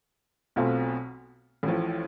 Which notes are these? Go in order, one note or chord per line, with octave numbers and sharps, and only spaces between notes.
B1 B2 A3 C4 F4
A1 A2 F3